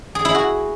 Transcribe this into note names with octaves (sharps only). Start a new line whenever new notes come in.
G#4
E4
F#4